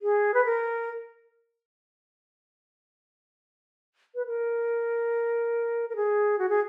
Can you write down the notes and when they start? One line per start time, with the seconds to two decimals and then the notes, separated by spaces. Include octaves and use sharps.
0.02 G#4
0.34 B4
0.45 A#4
4.15 B4
4.27 A#4
5.89 A#4
5.96 G#4
6.39 F#4
6.49 G#4